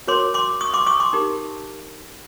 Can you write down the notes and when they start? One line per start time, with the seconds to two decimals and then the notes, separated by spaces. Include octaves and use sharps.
0.07 F#4 A#4 C#5 C6 D6
0.34 C6 D6
0.61 C#6 D#6
0.73 C6 D6
0.87 C#6 D#6
1.00 C6 D6
1.13 D#4 G4 A#4